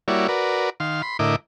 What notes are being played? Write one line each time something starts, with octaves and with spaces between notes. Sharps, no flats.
G3 A#3 E4 F#4 C#5 D5
F#4 A#4 B4 D5
D#3 F5 C6
B5 C6
A2 D3 E4 A#4 D#5 D6